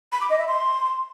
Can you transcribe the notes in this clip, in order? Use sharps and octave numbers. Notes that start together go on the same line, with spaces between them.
B5
D6
D#5
E5
C6